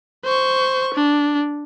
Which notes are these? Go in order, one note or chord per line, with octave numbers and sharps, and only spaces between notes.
C5 C#6
D4